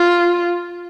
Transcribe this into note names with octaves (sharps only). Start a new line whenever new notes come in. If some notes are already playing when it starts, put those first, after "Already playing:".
Already playing: F4